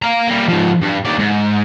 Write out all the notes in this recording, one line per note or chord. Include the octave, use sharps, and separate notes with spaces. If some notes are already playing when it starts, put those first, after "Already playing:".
F5 A#5
G3 A#3
G#2 F3
G2
D#2 D5
G#2